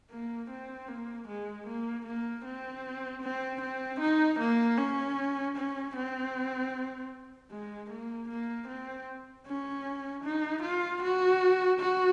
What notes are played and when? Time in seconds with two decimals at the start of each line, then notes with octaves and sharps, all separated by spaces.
0.11 A#3
0.50 C4
0.88 A#3
1.28 G#3
1.67 A#3
2.06 A#3
2.45 C4
3.22 C4
3.61 C4
4.00 D#4
4.39 A#3
4.78 C#4
5.57 C#4
5.96 C4
7.51 G#3
7.90 A#3
8.28 A#3
8.68 C4
9.46 C#4
10.24 D#4
10.62 F4
11.02 F#4
11.80 F#4